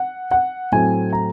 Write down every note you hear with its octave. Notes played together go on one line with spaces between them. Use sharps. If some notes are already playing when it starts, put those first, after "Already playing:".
Already playing: F#5
F#5
A2 F#3 A3 C4 G#5
A#5